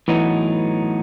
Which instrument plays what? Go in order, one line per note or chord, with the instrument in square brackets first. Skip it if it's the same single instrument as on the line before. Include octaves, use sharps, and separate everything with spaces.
[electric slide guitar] A2 F#3 B3 D#4 [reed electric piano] E3